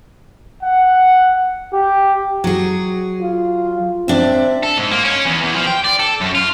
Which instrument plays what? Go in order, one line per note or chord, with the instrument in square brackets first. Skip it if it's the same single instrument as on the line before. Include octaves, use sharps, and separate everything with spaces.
[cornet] F#5
G4
[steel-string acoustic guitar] F#3 G#4
[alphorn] F4
[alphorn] C4 [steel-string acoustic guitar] D4 E5
[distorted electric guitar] A4
G#2
A#3
C#4
E2
E2
F3
G5
D5
A4
F#2
F4